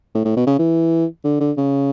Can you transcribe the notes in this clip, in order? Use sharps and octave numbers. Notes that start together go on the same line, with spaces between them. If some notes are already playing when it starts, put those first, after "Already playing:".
A2
A2
B2
C#3
E3
D3
D3
C#3